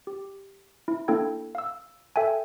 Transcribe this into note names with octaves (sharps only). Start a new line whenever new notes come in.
G4
E4
A#3 D4 E4 A4 G5 G#6
F5 E6
A4 E5 G5 G#5